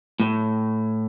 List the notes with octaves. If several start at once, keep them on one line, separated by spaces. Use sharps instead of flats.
A2